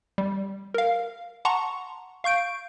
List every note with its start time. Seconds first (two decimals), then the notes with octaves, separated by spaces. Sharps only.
0.18 G3
0.74 A#4 F5
1.45 F#5 A5 A#5 C6 C#6
2.24 F5 C#6 G6 D7